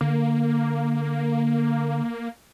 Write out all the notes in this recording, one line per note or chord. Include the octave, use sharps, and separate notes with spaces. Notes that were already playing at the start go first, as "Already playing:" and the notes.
D3 A#3